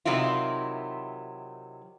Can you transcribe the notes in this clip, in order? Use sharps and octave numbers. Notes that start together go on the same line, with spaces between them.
C3 D#3 F#3 E4 F4